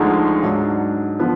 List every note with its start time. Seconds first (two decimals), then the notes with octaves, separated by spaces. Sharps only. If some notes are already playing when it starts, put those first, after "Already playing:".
Already playing: D2 D3 F3 G#3 D#4
0.42 G#2 F#3 D4
1.19 D3 F3 B3